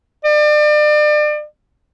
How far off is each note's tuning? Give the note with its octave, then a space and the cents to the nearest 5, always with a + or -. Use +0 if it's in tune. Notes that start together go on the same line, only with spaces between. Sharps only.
D5 +35